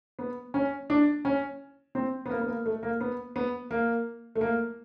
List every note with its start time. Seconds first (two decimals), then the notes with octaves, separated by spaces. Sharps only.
0.19 B3
0.54 C#4
0.90 D4
1.25 C#4
1.95 C4
2.26 B3
2.30 A#3
2.41 B3
2.48 A#3
2.66 A3
2.83 A#3
3.01 B3
3.36 B3
3.71 A#3
4.35 A3
4.41 A#3